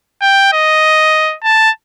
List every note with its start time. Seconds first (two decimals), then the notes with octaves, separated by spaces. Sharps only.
0.21 G5
0.53 D#5
1.44 A5